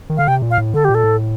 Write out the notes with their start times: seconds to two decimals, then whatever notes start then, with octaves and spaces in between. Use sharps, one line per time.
0.10 D#3
0.18 D3 F5
0.27 C3 G5
0.42 A#2
0.51 F5
0.58 A2
0.74 D3 A4
0.85 A#2 G4
0.95 A4
1.04 A2